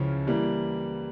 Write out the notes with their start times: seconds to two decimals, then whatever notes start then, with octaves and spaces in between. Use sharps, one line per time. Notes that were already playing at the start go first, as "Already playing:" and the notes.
Already playing: C#2 C#3 F3 C#4 E4
0.27 E3 G3 A#3